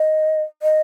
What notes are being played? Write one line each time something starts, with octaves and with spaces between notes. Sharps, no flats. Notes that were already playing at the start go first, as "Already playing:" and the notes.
Already playing: D#5
D#5